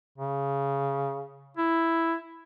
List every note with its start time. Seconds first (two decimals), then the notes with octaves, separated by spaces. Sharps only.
0.18 C#3
1.57 E4